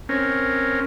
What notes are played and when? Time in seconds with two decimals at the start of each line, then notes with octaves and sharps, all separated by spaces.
0.09 C4 C#4 A#4